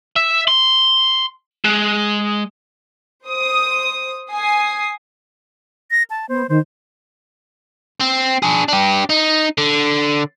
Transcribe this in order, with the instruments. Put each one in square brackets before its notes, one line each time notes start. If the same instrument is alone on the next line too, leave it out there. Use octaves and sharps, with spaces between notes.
[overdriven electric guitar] E5
C6
G#3
[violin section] C5 D#6
G#5 D#6 C7
[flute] A#6
A5
[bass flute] B3 [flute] C5
[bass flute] D#3 [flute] C5
[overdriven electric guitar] C4
D4 G#4
D4 G4
D#4
D3